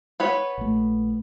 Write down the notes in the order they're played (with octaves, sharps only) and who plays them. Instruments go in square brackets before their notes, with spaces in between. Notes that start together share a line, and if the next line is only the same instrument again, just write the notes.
[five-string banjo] B3 B4 C#5
[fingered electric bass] A#1 A3